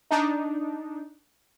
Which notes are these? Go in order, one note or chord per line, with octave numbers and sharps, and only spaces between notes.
D4 D#4